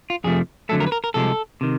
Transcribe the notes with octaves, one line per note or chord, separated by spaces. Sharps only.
F4
F2 C3 F3 A3 G#4
F2 D3 F#3 A3 A4
A#4
B4
A#4
A#4
C2 C3 F3 G#3 A4
C3 D#3